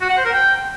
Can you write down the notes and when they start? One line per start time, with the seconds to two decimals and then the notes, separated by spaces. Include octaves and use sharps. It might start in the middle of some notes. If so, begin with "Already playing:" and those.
0.01 F#4
0.09 F#5
0.17 C5
0.25 A#4
0.33 G5